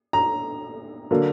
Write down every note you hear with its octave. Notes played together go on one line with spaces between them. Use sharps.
A#5
D3 F#3 A#3